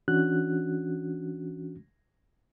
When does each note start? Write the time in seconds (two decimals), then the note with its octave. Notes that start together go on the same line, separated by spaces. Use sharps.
0.08 E3 C#4 D4 F#4 F#6